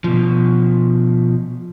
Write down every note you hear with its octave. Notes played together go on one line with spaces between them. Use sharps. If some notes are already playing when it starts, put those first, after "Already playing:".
B2 F3